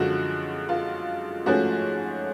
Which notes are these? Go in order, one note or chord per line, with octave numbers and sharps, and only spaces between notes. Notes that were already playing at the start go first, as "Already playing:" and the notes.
Already playing: F#2 D3 F3 G#3 F#4
F4
G#2 F3 A3 C#4 F#4